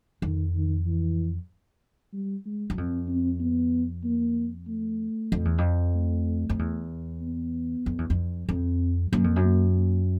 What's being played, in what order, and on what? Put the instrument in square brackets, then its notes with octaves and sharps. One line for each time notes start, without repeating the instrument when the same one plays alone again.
[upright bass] F2 [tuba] D#3
[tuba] D#3
E3
G3
G#3
[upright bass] F#2
[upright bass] F2 [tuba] C4
[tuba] C4
B3
A#3
A3
[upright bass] F2
E2
F2
[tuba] A3
[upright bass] F2
E2
[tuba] B3
[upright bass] F2
E2
F2
[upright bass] F2 [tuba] C4
[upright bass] F#2 [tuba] A#3
[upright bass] F2
F#2
[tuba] A#3
A#3